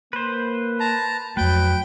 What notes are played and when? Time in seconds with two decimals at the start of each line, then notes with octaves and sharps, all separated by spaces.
0.13 A#3 B4 C5
0.80 A5 A#5
1.37 F2 F#3 A3 B4 G5